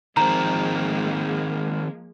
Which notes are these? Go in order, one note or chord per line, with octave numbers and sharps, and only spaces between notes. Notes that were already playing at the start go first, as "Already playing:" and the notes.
D#3 F3 G#3 A#3 C4 A#5